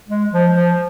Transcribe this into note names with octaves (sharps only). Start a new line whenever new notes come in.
G#3
F3
F3